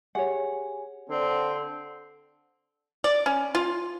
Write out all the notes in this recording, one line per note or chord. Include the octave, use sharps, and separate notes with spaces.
G4 G#4 C#5 F#5 G#5
D3 C4 D5
D5
C#4
F4